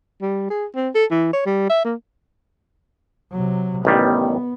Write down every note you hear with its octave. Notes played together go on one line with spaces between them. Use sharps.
G3
G#4
C4
A4
E3
C#5
G3
E5
A#3
C3 F#3
A1 D#3 G3 B3